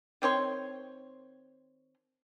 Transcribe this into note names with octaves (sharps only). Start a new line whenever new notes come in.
D#3 C4 C#5 C6